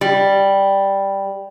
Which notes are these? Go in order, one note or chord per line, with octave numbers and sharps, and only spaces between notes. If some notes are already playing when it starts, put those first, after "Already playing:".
G3